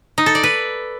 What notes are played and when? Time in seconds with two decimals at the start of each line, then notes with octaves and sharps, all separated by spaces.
0.18 D#4
0.26 A4
0.35 D5
0.43 B4